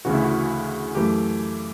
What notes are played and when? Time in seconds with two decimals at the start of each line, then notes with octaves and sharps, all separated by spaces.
0.05 D2 C#3 E3 F#4
0.15 E4
0.25 F#4
0.95 F#2 E3 A3 G4